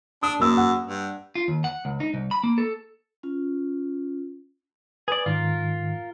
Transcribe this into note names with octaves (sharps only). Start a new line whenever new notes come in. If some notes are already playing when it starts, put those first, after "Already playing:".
D4 D#6
F#2 A#3 E6
F#5
G2
F4
D#2
F#5
C#2
D#4
C2
B5
A#3
A4
C#4 F4
G#4 B4 D5
G#2 D#3 F4 A#4